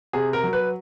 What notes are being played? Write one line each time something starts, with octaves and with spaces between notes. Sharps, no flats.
C3 G#4
A#4
F#3
B4